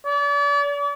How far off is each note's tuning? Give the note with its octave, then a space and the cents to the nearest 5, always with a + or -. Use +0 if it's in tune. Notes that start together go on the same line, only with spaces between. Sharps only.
D5 -40